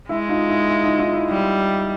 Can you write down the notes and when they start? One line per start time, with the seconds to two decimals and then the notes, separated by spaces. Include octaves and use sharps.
0.09 G#3 E4
0.29 D#4 F4
0.48 E4
0.69 E4
0.83 D#4 F4
0.99 D#4 F4
1.13 E4
1.29 G3